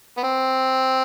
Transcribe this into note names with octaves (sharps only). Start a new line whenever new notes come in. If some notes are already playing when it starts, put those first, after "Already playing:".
B3
C4